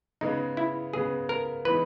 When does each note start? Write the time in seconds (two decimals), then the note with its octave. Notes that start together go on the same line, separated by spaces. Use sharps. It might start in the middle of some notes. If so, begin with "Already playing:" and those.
0.21 C#3 G#3 B3 D#4
0.57 E4
0.93 C#3 G#3 B3 G#4
1.29 A#4
1.65 E3 G#3 B3 D#4 B4